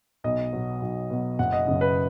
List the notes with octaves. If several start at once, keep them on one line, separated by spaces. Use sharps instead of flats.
B1 D#5
B2 F#3
B1
B2 F#3
F#1 F#5
D#5
F#2 C#3 D#5
B4